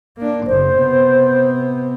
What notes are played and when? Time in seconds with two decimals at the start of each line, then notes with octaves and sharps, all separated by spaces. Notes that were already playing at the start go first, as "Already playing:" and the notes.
0.17 A#3 D4
0.46 F#1 C#3 C5
0.75 C3 B3